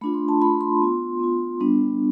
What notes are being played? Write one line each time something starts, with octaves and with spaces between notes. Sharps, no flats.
A3 D4 F4 B5
C6
A5
A3 D4 F4 B5
C6
B3 F4
B3 F4
G3 B3 D4